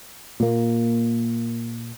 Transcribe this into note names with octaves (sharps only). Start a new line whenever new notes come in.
A#2 A#3